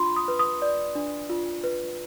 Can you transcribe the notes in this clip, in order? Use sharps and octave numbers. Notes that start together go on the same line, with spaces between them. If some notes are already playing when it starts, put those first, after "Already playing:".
Already playing: D4 F4 B5 C6
D#6
B4
D#6
D5
D4
F4
B4